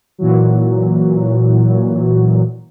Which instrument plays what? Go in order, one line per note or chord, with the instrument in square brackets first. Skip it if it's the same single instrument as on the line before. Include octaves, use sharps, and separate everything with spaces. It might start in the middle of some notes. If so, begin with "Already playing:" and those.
[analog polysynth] A#2 E3 F#3